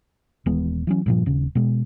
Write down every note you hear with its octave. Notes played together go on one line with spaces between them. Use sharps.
D#1 E3 G#3 B3
E3 F#3 C#4
G2 A#2 F3
D#1 C#3
B2 G#3